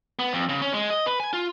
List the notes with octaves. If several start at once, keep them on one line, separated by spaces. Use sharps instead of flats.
B3
F2
C#3
C#4
G#3
D#5
B4
G#5
F4